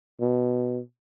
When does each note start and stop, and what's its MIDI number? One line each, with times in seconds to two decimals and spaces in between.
0.20 0.80 47